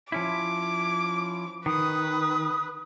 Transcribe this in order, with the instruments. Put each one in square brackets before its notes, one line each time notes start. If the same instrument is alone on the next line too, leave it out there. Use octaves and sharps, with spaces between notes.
[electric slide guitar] F3 C#4 E4 [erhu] D6
[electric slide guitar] D#3 [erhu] B4 [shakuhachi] D#6